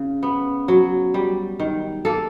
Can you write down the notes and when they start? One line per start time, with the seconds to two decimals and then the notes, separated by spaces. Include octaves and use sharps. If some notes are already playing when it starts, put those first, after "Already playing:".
Already playing: C#3
0.23 B3
0.68 F#3
1.14 G3
1.60 D#3
2.05 A#3 A4